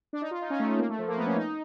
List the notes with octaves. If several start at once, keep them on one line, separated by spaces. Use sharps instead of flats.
D4
D#4
F4
D#4
C#4
A3
A3
A#3
A3
F3
A#3
B3
C#4
D#4